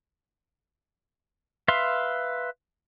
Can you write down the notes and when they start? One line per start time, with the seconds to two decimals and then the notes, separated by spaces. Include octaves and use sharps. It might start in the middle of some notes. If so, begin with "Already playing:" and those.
1.68 B4 E5 F5 C6